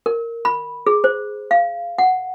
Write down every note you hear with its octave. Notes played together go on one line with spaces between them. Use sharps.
A#4
B5
G#4
C5
F5
F#5